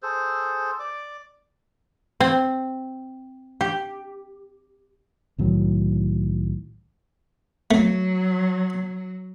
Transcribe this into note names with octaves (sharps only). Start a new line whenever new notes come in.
G#4 A4 C5
D5 D6
C4
G4
C2 A2 D#3 F#3
F#3 A3